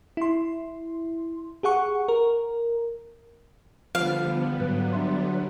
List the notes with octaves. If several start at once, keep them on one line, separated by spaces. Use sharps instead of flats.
E4 C6
G4 G#4 F#5 C#6
A#4
D3 F3 G3 B3 F5
G#2 F#3 B4
D4 E5 C6